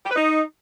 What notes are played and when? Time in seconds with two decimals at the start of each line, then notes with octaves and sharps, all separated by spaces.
0.04 G4
0.09 B4
0.15 D#4